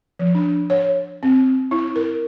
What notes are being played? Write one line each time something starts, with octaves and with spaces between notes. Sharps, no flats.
F3
D4
C#5
C4
E4
A#4